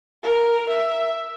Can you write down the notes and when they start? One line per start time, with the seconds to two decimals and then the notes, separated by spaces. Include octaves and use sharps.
0.23 A#4
0.69 E5